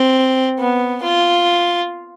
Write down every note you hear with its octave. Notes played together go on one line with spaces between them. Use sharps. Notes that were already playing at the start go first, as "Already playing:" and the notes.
Already playing: C4
B3
F4